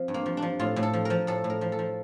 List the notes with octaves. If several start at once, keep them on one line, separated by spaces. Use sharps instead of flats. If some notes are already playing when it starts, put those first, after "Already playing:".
Already playing: F3 C4
G2
A#3
F3
D4
F3
A2 F4
A2
A4
F3
F3 A#4
A2 A4
A2
A#4
F3
A4
F3